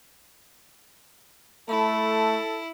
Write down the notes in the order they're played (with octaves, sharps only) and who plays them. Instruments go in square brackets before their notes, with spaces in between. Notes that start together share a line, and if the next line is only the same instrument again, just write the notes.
[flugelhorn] A3 [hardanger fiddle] E4 [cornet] A4 [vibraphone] A5 B5